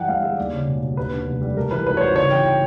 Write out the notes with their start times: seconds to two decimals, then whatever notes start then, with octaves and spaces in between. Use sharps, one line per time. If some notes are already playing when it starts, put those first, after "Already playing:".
Already playing: G2 E3 F#5 G5
0.08 G1 F5
0.23 G#3 E5
0.37 D#2 D5
0.52 C#3
0.67 E1
0.82 E1
0.97 D#2 B4
1.12 D3
1.27 F1
1.41 G3
1.57 G2 A#4
1.71 E3 B4
1.86 G#1 B4
1.97 C#5
2.01 G#1 C5
2.16 C#3 C#5
2.31 E3 G5
2.46 G5